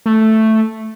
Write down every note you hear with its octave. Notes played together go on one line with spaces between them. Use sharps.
A3